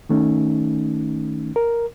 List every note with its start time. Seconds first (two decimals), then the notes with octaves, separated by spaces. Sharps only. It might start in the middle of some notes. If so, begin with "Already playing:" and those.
0.09 D#3 A3 C#4 D#4
1.56 A#4